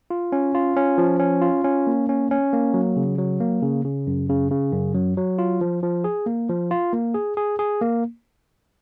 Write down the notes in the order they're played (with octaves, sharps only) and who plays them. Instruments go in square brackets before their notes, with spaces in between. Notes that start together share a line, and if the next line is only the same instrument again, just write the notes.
[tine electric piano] F4
C#4
F4
C#4
F3
C#4
F4
C#4
A#3
C#4
C#4
A#3
F#3
C#3
F#3
A#3
C#3
C#3
F#2
C#3
C#3
F#2
F#3
F#3
F4
F3
F3
G#4
A#3
F3
F4
A#3
G#4
G#4
G#4
A#3